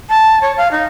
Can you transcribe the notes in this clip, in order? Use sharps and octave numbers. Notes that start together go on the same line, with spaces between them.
A5
C#5
F5
D#4